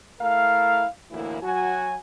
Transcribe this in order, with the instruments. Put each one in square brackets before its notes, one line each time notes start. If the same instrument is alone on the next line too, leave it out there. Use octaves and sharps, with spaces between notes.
[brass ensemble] A3 E4 A#4 F5
D2 A2 E3 A#3 E4
F#3 F#4 G#5